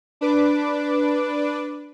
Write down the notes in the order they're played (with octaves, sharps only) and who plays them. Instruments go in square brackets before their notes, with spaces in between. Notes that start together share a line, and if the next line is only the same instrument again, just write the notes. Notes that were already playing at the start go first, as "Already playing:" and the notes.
[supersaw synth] D4 B4 D6